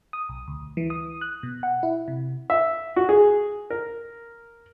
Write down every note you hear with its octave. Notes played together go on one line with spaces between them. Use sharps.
D#6
B1
D2
E3
D#6
F#6
B2
F#5
E4
C3
E5
F#4
G#4
A#4